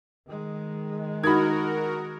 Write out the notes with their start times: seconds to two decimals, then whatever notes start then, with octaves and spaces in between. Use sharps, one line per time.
0.27 D#3 G#3
1.24 D#4 F#4 A#4 B5 D#6 G#6